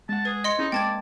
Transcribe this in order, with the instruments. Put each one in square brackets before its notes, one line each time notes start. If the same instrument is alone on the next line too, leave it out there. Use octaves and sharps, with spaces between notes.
[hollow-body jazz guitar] G#3 F#5 [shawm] A5
[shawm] G#4 [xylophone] B4
[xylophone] D#5 C6 C#7
[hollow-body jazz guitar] C#4 E4 G#4 [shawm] D#4
[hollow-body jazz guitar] G#3 A#3 C4 [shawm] D5 [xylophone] G5 A5 G#6